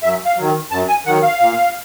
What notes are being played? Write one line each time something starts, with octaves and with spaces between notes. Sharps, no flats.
F#2 E5
F5
D#3 F#3
F#2 A5
G#5
D#3 F#3 F#5
F5
A#2